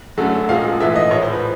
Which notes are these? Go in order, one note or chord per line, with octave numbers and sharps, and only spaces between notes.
F#2 D3 F#3 A3
A#2 F3 G#3 F5
G#2 E3 A3 E5
D#5
A2 F3 G#3 C#5
C5
B4